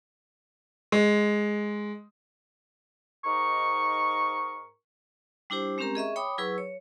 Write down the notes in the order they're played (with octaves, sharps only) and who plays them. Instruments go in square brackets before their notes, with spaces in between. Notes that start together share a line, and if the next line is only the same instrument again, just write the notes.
[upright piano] G#3
[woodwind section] G#2 D#4 A#4 C#6
[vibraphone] G3 D4 E4 G4 C5
G#3 C4 C#4 G4 A#4 A#5
G#4 D#5 E5 C#6
C#5 G5 B5 D6 D#6
F#3 E4 G#4 B4 C#6 E6
C#5